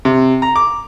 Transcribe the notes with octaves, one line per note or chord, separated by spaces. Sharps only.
C3
A#5
D6